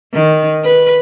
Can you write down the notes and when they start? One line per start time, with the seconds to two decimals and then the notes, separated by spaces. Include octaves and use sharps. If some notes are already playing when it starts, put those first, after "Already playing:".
0.13 D#3
0.64 B4